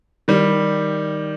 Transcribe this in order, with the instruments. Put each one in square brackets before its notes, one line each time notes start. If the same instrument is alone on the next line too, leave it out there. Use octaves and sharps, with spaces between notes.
[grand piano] D#3 G3